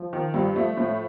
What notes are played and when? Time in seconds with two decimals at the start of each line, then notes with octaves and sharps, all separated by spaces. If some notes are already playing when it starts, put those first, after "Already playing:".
Already playing: F3
0.13 D#3
0.34 G2
0.56 A3
0.77 A2